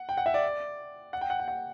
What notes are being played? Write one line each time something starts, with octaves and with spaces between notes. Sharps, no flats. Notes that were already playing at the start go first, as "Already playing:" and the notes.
Already playing: F#5
G5
F#5
E5
D5
F#5
G5
F#5
G5
F#5